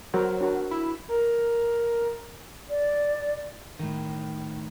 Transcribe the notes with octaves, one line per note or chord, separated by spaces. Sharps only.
F#3 F#4 A#4 C5
D4 F#4 A#4
E4
A#4
D5
A2 D#3